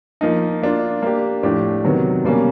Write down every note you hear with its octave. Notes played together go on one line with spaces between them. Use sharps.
F3 A#3 D#4
A#3 D4 F4
A#3 D4 G4
A2 F3 A3 D4 G4
C3 D#3 F#3 B3
B2 G3 A#3 C#4